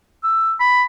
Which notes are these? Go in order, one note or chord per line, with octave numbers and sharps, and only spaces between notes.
E6
B5